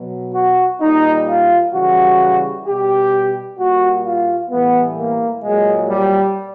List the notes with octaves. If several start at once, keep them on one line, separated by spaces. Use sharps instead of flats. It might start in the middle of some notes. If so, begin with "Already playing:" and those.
Already playing: B2 F#3
F#4
A#2 G3 D#4
F4
C#3 E3 G3 F#4
B2 G3 G4
A#2 G3 F#4
F4
A2 E3 G3 B3
A#3
A#2 F#3 G#3
G3